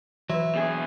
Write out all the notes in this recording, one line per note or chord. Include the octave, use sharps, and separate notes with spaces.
E3 F#3 E4 B4
B2 G#4